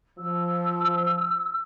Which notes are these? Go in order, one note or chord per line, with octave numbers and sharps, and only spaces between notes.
F3 E6